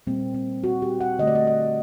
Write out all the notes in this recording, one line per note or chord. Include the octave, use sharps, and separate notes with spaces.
A#2 G3 A#3 C4
C4
F#4
G4
F#5
D3 A3 D#5
D5
D#5
D#5